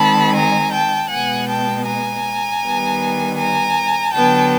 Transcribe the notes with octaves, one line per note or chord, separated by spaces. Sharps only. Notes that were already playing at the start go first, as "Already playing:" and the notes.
Already playing: D#3 G#3 C4 A5 B5
G#5 A#5
G5 A5
B2 G#3 B3 F#5 G#5
G5 A5
G#5 A#5
D#3 G3 B3
G#5 A#5
D3 F#3 B3 G5 A5